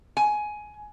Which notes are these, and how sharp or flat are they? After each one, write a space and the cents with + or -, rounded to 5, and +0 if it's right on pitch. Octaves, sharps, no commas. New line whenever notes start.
G#5 +15